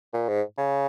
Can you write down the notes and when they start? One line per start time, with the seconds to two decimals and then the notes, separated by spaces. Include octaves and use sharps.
0.14 A#2
0.29 G#2
0.58 C#3